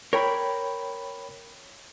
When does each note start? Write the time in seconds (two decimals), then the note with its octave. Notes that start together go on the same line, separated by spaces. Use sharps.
0.13 A#4 C#5 D5 G5 B5